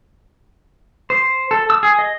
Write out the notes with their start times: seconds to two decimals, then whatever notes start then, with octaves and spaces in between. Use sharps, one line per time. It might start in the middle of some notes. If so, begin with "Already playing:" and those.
1.10 C5
1.51 A4
1.70 E6
1.83 G#4
1.99 D#5